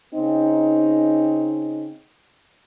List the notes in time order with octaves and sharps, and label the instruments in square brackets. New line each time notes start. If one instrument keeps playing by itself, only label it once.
[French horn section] C#3 C4 D#4